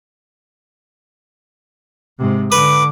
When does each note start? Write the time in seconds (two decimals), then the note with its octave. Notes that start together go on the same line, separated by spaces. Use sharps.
2.19 G#2 C3
2.52 D3 B4 D6